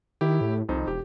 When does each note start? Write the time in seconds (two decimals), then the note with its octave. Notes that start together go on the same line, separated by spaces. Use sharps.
0.21 D#3 E4 G4
0.41 A2
0.69 C2 F2 D#4 C5
0.88 E1 G4